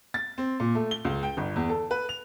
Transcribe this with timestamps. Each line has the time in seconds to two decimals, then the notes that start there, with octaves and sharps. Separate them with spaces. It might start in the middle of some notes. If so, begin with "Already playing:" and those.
0.14 A6
0.38 C4
0.60 A#2
0.75 A3
0.91 G7
1.05 C#2
1.23 G5
1.37 G1
1.56 E2
1.69 A4
1.91 B4
2.09 F7